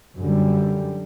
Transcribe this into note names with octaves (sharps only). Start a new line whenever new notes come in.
F#2 D3 G3